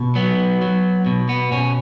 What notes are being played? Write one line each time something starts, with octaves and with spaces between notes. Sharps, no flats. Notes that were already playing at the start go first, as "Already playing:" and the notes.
Already playing: B2
F#3 B3
F#3
B2
B3
B2 C#4